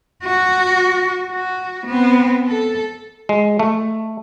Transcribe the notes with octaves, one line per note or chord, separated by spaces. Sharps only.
F#4
F#4
B3 C4
A4
G#3
A3